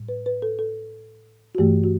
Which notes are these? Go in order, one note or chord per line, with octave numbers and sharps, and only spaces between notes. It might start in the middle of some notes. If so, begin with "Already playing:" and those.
Already playing: A2 G3
B4
B4
A4
A4
F#4
G2 E3 A3 G4
F#4